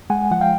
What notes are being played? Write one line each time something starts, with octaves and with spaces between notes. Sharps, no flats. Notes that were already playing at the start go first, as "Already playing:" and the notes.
G#3 F#5 G#5
F3 F#5
F5 G5